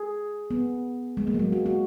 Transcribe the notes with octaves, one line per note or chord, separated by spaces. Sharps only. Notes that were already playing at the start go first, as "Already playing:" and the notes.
Already playing: G#4
B3
G#3
A#3
F#3
G#3
F#4
F#4